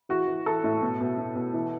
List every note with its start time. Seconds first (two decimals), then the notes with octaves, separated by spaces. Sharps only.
0.09 E3 F#4
0.27 E3
0.46 E3 A4
0.64 A2
0.82 B2
1.01 B2
1.18 B2
1.36 B2
1.54 E3